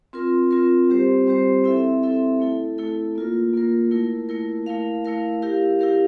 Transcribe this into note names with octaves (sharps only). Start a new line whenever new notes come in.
C4 F4 A#4
C4 F4 A#4
G3 C4 G4 C5
G3 C4 G4 C5
C4 E4 A4 E5
C4 E4 A4 E5
A3 E4 A4
A3 E4 A4
A#3 F4 A#4
A#3 F4 A#4
A3 E4 A#4
A3 E4 A#4
A3 E4 A#4 F5
A3 E4 A#4 F5
E4 G4 A#4 F5
E4 G4 A#4 F5